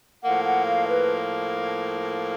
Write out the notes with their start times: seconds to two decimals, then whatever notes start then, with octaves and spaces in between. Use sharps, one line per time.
0.23 A2 F3 A#3 F#5
0.44 F#5
0.67 F5
0.88 B4